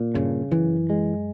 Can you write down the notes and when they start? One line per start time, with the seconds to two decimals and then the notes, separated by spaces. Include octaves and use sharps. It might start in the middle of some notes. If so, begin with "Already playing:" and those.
Already playing: A#2
0.15 G2 C#3
0.51 F#2 E3
0.90 G#3